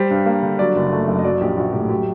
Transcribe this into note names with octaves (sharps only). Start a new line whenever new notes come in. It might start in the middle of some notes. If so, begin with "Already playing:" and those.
Already playing: G3 C5
G2
A#3
D3
F#3 D5
F#1
A3
F#2
D#5
F#3 D5
A#1 G4
A#1 F#4
A2 G4
F#3 G4